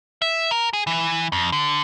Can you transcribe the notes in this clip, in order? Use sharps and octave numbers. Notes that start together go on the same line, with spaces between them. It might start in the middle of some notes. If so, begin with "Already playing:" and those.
E5
A#4
G#4
E3
F2
D3